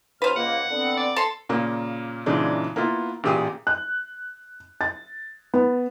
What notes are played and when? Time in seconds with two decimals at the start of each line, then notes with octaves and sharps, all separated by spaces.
0.22 F#2 B4 C5 F6
0.36 C#2 A#3 F#5
0.71 D3 B3 C4
0.97 D5
1.16 A4 A5 C6
1.49 A#2 C#3 A#3 D6
2.26 A#2 C#3 E3 G#3 D4 D#4
2.76 A#3 B3 E4 F4
3.24 A1 A#2 G4 G#4 D#6
3.67 F#6
4.81 A6
5.54 B3